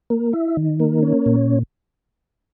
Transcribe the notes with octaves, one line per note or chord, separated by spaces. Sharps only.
A#3
E4
D#3
A#3
C#4
A#2